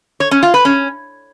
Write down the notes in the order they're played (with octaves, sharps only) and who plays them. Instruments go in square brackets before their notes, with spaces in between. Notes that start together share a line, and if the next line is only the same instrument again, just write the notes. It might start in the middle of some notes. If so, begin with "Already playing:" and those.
[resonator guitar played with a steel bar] C#5
C#4
F4
B4
C#4